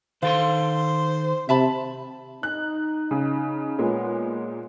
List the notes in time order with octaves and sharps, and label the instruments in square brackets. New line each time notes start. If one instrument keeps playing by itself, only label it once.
[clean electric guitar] D#3 A4 C6 [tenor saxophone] C5 [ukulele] F5
[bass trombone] C3 [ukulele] E5 A5 B5
[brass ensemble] D#4 [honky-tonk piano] F#6
[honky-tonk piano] C#3
[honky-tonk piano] A#2 G#3 [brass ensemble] B3 C#5